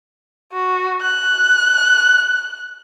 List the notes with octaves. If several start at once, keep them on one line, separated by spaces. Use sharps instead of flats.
F#4
F#6